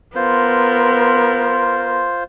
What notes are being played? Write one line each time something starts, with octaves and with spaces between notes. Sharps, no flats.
B3 F4 A#4 C5